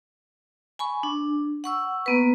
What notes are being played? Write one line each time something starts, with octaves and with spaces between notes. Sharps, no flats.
G#5 B5 C#6
D4
F#5 C#6 E6
A#3 B3 B4